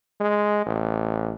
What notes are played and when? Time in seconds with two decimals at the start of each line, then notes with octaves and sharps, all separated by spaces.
0.20 G#3
0.66 A1